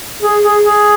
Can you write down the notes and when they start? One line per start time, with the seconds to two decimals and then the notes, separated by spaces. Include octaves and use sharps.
0.23 G#4
0.43 G#4
0.62 G#4